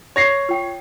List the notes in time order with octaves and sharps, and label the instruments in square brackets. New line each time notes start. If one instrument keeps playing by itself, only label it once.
[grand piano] C#5 A#6 C7
[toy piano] F4 G5